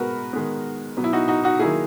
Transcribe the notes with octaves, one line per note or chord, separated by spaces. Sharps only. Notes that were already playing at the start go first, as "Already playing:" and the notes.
Already playing: B2 G#3 B3 F#4 A#4 B4
D#3 G#3 B3
B2 F#3 B3
E4
D#4 F#4
D#4 F#4
D#4 F#4
D#3 F#3 A#3 E4 G#4